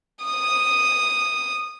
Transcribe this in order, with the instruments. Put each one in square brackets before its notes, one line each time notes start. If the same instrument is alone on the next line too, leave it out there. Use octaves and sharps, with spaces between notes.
[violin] D#6 D#7